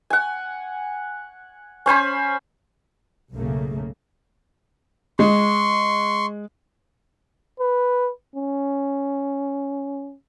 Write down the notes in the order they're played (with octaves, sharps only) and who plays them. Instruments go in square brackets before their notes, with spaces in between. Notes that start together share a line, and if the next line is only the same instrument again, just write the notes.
[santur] F#5 G#5
C#4 C5 G#5 B5
[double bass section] B1 F#2 C#3 A3 A#3
[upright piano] G#3 [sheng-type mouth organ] C6 C#6
[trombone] B4
C#4